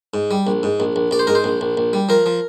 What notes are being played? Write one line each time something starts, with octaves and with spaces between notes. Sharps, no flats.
G#2
G3
A#1
G#2
A#1
A#1
A#1 D5
C5
G#2 A#4
C5
A#1
A#1
A#1
G3
F3 A#4
F3